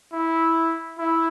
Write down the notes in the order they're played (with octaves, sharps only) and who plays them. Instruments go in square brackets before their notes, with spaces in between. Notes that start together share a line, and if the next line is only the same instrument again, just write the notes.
[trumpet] E4
E4